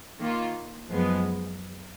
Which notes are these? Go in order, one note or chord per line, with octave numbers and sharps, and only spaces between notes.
D#3 A#3 F4
F#2 F3 G#3 B3